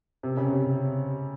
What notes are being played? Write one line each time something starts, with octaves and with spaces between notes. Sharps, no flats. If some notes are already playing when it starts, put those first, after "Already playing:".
C3
C#3
C3